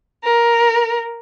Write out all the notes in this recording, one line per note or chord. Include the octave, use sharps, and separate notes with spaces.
A#4